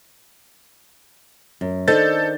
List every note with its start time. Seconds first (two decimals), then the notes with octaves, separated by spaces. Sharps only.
1.61 F#2
1.88 D#3 D4 A4 C5 D#5 G6 A6